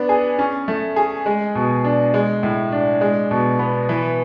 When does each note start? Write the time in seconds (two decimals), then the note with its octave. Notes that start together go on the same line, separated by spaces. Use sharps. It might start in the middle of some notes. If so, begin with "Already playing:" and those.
Already playing: B3 D4
0.09 G#4
0.39 C#4
0.68 A3
0.96 G#4
1.26 G#3
1.55 B2
1.84 D4
2.14 G#3
2.43 A2
2.72 D4
3.01 G#3
3.31 B2
3.59 B3
3.89 E3